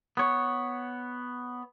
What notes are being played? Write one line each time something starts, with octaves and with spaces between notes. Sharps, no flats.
B3 C#5